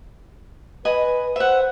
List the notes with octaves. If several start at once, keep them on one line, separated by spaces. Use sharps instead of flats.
B4 D#5 G#5 B5
C5 E5 F#5